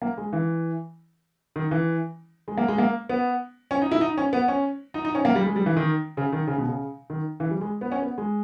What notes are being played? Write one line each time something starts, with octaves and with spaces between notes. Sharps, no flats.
A#3
G#3
E3
D#3
E3
G#3
A#3
G#3
A#3
B3
C#4
D#4
E4
D#4
C#4
B3
C#4
D#4
D#4
C#4
A#3
G3
G#3
G3
E3
D#3
C#3
D#3
C#3
B2
C#3
D#3
E3
G3
G#3
B3
C#4
B3
G#3